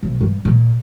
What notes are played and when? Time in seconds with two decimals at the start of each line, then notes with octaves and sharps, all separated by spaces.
0.03 B1
0.21 G2
0.45 A#2